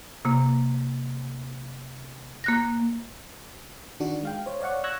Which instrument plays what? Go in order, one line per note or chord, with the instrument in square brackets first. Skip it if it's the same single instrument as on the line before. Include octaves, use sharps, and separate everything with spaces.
[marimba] C3 A#3
A#3 F#6 A#6
[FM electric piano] D#3 D4 F#4
G#3 F5 G5
C5 C#5
C#5 D5 F5 F#5 C#6
C#6 E6 F#6 G#6 A#6